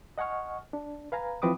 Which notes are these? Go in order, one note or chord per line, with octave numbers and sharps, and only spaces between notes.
D#5 F#5 G#5 C#6 F6
D4
B4 F5 G#5 A#5
E3 F3 C4 B4 D6 D#6